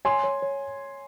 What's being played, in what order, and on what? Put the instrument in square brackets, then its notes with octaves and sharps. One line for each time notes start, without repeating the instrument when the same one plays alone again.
[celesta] C#5 [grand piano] G#5 C6
[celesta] C#5
C#5